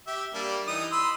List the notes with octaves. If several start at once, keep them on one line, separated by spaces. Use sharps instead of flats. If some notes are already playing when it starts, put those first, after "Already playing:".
G4 E5
G3 A#3 D4
E3 D#4 D#6
B5 C6 E6